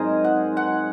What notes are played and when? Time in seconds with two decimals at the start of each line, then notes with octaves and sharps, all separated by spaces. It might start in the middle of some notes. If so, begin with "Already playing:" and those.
Already playing: G#2 F#3 C4 D#4 G#4 A#4 C5 D#5
0.24 F#5
0.57 F#5